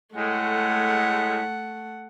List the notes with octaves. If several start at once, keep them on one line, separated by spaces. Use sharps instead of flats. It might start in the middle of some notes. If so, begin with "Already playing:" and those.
A2 G#3 A3 F#5